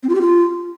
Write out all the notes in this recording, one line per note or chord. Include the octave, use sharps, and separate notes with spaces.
C4
F4
G4
F4